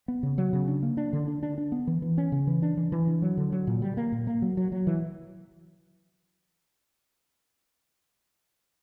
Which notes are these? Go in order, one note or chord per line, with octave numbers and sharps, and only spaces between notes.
B3
C#3
F#3
C#3
D4
A#3
D4
D3
D4
D4
D4
B3
E3
E3
C#4
C#3
E3
D4
E3
E3
D4
F#3
D3
F#3
A#2
G3
A#3
A#2
A#3
F#3
F#3
F#3
E3